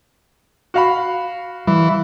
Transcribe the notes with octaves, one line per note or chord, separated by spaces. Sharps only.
F#4 F5 B5
E3 G3